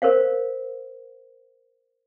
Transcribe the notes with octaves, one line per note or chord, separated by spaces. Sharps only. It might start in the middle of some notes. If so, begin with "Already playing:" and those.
A#4 C5 C#5 F5